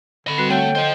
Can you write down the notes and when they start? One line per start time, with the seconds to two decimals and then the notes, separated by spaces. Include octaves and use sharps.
0.27 D3 D#5 B5
0.38 G3 C4 F#4 B4
0.50 A3 C#5 F#5 G5
0.75 F4 C5 D#5